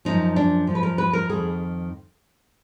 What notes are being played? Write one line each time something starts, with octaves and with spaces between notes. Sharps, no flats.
F#2 F3 D#4
D4
F#2 F3
B4
A#4
B4
A#4
F2 D#3 G#4